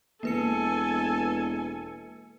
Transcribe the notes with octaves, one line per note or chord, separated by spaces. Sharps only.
E1 A#3 A4 B4 G#5 C#7